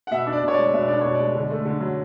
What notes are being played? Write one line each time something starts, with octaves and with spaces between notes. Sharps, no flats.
F#5
B2 E5
D4
D5
B2
C#5
G#3 D5
B2 E5
D4 D5
B2 C#5
G#3 D5
D3
A3
D3
F#3